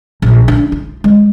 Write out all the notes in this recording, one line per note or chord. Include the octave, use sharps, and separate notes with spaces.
A#1
D4
F4
G#3